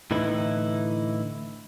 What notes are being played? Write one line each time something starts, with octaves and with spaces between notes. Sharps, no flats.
A2 D3 E3 D#4 E4